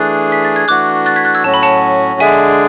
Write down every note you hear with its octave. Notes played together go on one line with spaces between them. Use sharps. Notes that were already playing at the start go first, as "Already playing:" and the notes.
Already playing: E3 A3 D4 G#4 F#6 A6
B6
A6
G#6
E3 A3 D4 F#4 D6 F#6
F#6 A6
G#6 B6
F#6 A6
E6 G#6
A2 F#3 C#4 F#4 A5
B5
F#5 A5
D3 G#3 D4 G#4 E5 G#5